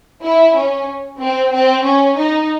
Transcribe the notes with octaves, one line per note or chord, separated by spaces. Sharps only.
E4
C#4
C4
C4
C#4
D#4